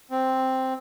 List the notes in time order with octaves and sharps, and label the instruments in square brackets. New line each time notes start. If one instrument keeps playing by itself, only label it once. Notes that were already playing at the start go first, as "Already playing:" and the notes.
[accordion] C4